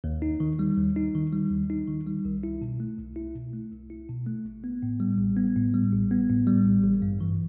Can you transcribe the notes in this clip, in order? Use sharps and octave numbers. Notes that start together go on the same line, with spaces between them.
D#2
D#4
D#3
G3
D#2
D#4
D#3
G3
D#2
D#4
D#3
G3
C2
E4
B2
A3
C2
E4
B2
A3
C2
E4
B2
A3
A1
B3
A2
G3
A1
B3
A2
G3
A1
B3
A2
G3
A1
A1
G2
E3